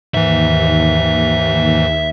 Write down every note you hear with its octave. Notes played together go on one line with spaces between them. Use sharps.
D#2 G#2 E3 E5